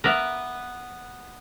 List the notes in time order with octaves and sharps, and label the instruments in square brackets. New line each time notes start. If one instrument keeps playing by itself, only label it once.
[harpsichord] B3 B4 [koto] A#4 D5 E5